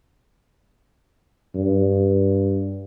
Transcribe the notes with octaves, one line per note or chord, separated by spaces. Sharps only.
G2